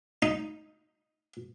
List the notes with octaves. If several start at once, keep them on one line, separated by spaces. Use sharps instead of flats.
D#4